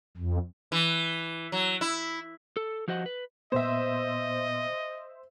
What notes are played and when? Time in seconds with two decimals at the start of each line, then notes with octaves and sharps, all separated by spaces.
0.17 F2
0.72 E3
1.52 F#3
1.81 E4
2.57 A4
2.88 F3 F#4 C5 D#5 F#5
3.06 B4
3.52 A#2 B3 C5 D#5 E5